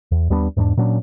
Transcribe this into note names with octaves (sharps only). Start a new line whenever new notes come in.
E2
D#2 G3 B3 D4
E2 G#2 G3 D4
A#2 F#3 C#4 D4